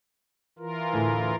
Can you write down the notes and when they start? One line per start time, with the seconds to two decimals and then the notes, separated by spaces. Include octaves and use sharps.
0.59 E3 F4 A#4
0.93 D2 A2 G#5